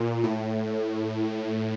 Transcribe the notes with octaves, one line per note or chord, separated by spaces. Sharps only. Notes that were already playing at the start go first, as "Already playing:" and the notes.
Already playing: A#2
A2